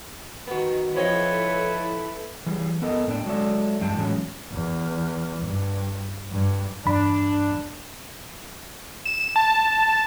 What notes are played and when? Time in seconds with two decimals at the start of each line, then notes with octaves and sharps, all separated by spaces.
0.47 B2 D#3 B3
0.96 F3 C4 E4 A4 B4 C#5 D#5
2.46 E3 G3 G#4
2.82 B3 A4 A#4 D#5
3.07 A2 C4 D4 G5
3.26 F#3 G#3 F#4 A4 D5 E5
3.79 E2 G2 G#3 C4 G5 A5
3.97 A2 E3 F#3 G#3 C#4 F#4
4.51 E2
5.42 G2
6.32 G2
6.85 E2 G2 D4 B5
9.06 E7
9.36 A5